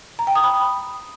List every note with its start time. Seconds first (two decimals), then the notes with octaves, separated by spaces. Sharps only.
0.19 A#5
0.27 G5
0.35 D#6
0.44 B5